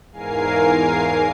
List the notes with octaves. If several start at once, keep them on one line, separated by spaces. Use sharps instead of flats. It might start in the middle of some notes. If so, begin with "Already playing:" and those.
E2 G#2 A#4 F5 G#5 C7